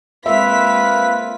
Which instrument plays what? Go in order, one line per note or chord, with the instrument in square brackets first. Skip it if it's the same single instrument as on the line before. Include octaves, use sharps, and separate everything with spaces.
[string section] G#3 A#3 B6 [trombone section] C4 F4 [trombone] B4 [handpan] E5